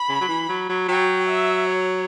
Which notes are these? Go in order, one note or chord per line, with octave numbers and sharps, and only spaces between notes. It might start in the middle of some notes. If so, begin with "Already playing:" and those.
Already playing: B5
C#3
F#3
E3
F#3
F#3
F#3 G5
E5
C#5